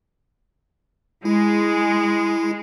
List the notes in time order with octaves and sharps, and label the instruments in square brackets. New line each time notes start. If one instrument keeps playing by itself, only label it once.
[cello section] G#3 [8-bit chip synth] E4